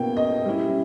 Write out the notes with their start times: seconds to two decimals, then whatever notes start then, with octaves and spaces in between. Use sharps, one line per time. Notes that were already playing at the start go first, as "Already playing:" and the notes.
Already playing: B2 A#3 C#4 E4 G5
0.17 D#5
0.45 G3 C#4 E4